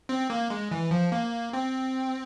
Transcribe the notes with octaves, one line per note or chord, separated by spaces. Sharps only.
C4
A#3
G#3
E3
F3
A#3
C4